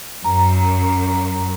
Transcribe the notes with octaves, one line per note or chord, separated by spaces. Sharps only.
F#2 A#5